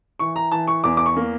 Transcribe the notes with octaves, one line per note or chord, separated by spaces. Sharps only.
E3 C#6
A#5
E3 A5
C#6
E2 D6
D6
C#6
A#3